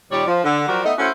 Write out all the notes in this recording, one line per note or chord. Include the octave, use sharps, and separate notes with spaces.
A#2 D#3 G3 C#5 D5
F3
D3
F3 F#3 F#4 G4 A#4 D5
A3 B3 D#4 D#5
A3 C#4 E4 F#4 A4 C5